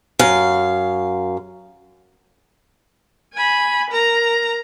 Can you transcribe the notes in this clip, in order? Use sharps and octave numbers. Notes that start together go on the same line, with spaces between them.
F#2 F5
G#5 B5
A#4 A#5